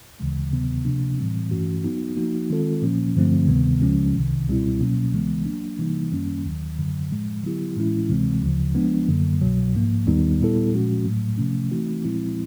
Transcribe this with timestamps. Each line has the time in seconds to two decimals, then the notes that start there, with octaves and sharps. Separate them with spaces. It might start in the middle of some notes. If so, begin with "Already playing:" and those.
0.20 D2 C#3 E3 G#3
0.52 D2 C3 D#3 F#3 B3
0.85 C3 F3 A#3 D4
1.18 A2 E3 G3 C4
1.51 G2 E3 A3 C#4 F#4
1.84 F#3 B3 D#4 F#4
2.16 F3 A#3 D#4 F#4
2.50 D#3 G#3 C4 F4 A4
2.82 A#2 F3 A#3 C#4
3.16 G2 D3 F3 A3 C4
3.48 D2 C3 D#3 G3 B3
3.82 C#2 C#3 F3 G#3 C#4
4.14 C2 C3 D#3
4.48 C#2 B2 G3 C4 E4
4.80 B2 F#3 A#3 C#4
5.13 C#2 C#3 E3 G#3 B3
5.45 F#3 A#3 D4
5.79 C3 E3 G3 A#3 D#4
6.12 F#2 D#3 G3 A#3 C#4
6.45 D#2 D#3 F#3
6.78 F#2 D3 F#3
7.11 A2 F3 G#3
7.43 D3 F#3 B3 E4 G4
7.76 A2 E3 G#3 C#4 E4
8.09 D2 C3 E3 G#3 C4
8.41 D2 C#3 F3
8.75 F3 G#3 B3 D4
9.08 F#2 D3 F#3 A#3
9.41 C2 B2 F#3
9.74 G#2 F3 A#3
10.06 D#2 D#3 G3 B3 D#4
10.40 A#2 G3 B3 E4 A4
10.72 A#2 F3 G#3 C#4 F#4
11.05 A2 F#3 A3
11.38 C3 F3 A3 C#4
11.70 E3 A3 C4 D#4 F#4
12.04 A#2 F3 G#3 C4 E4